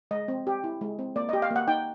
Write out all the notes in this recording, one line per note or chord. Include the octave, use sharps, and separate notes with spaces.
G#3 D#5
C4
G4
E4
G#3
C4
A#3 D5
D#5
G4
F5
A#3
F#5
D#4 G5